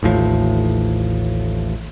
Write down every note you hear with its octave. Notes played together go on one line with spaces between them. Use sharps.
A1 D#2 A2 F3